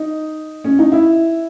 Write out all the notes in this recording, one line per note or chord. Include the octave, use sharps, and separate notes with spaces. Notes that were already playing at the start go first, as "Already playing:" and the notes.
Already playing: D#4
C#4
D#4
E4